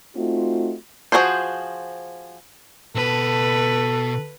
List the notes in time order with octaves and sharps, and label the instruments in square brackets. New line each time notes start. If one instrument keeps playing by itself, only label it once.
[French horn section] A3 C4 D#4 F4 F#4
[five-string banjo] F3 F#3 F#4 G#4 C5
[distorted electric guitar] B2 A5 [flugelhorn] A4 [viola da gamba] B4